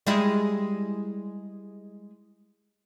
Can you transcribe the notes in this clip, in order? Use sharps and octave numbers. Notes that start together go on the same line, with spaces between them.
G3 G#3 E4